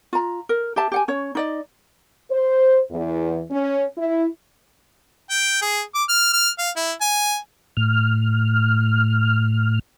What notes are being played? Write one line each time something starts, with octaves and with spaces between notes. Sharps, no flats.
F4 A#5
A#4
G4 E5 A5
G4 F#5 G#5
C#4 C#5
D#4 D5 D#5
C5
E2
C#4
E4
G5
G#4
D6
F6
F6
F5
E4
G#5
A2 F6